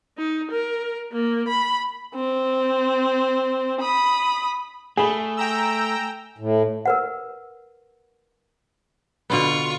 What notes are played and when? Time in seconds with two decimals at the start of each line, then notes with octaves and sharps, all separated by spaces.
0.18 D#4
0.51 A#4
1.12 A#3
1.48 B5
2.15 C4
3.81 B5 D#6
4.97 A3 G#4 G#5 B5 G7
5.37 G5 A#5 E6
6.38 A2
6.86 A#4 B4 F#5
9.30 B2 D3 B3 F4 C#6